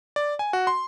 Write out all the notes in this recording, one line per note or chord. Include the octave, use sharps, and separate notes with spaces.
D5
G#5
F#4
C6